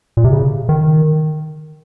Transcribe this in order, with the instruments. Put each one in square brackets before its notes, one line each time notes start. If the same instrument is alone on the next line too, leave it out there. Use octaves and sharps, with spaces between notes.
[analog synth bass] A#2
C3
C#3
D#3